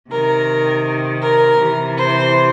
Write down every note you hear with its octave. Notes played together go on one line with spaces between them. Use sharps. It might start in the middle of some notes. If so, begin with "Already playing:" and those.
C3 D#3 A#4
A#4
C3 E3
C5